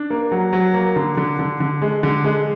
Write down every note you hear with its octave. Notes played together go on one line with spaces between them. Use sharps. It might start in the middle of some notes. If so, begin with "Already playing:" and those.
Already playing: D4
A#3
F#3
F#3
A#3
D3
D3
D3
D3
G#3
D3
G#3